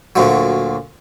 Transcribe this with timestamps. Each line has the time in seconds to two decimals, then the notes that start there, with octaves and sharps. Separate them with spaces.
0.16 D2 A#2 D3 F#3